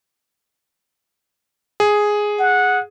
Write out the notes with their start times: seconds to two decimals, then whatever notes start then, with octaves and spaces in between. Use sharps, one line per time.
1.80 G#4
2.39 F#5